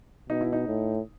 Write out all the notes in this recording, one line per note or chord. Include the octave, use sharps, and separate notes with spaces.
B2 D#4
E4
D#4
A2